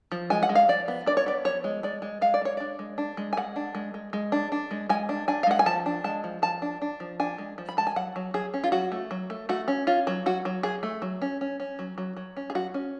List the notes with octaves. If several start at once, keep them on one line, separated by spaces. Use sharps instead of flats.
F3
G#3 G#5
F#5
G#3
F5
F3 D5
B3
D4 D5
C#5
B3 D5
F3 C#5
G#3
G#3 D5
G#3
G#3 F5
D5
G#3 C#5
D4 D5
G#3
D4
G#3
G#5
G#3 F#5
D4
G#3
G#3
G#3
D4
D4
G#3
G#3 G#5
D4
D4 G#5
F5
G#3 F#5
G#5
F3 A5
D4
G#3 A5
F3
F3 A5
D4
D4
F3
D4 G#5
G#3
F3
B5
G#3 A5
G#5
F#3 F#5
F#3
F#3 G#4
C#4
F4
F#3 F#4
A3
F#3
A3
A3 F#4
C#4
C#4 F4
F#3
F#3 F#4
F#3
F#3 G#4
A3
F#3
C#4
C#4
C#4
F#3
F#3
F#3
C#4
G#4
F#3 F#4
C#4